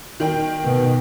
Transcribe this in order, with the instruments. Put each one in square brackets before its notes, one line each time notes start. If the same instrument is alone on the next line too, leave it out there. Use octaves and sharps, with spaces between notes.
[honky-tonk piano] D#3 G5
[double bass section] B2